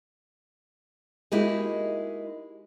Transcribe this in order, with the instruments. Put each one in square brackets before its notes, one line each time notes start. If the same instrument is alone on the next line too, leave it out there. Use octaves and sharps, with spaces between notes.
[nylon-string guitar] G#3 A#3 D#4 E4 F#4 G4